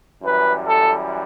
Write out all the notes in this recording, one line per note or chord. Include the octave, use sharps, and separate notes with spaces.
F#2 E3 G3 B4
A4